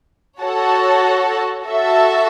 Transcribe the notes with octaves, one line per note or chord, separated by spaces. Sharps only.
F#4 A4 C#5 F#5 A5
F#4 A4 E5